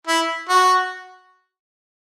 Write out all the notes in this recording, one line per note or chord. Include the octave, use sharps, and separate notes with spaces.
E4
F#4